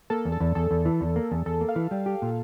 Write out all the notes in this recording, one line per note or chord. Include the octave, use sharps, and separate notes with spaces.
A#3 A4
E2
A4
E2
E2 A4
E2
E3
E2
A#3
E2
E2 A4
A#3
F5
E3
G3
G4
A#2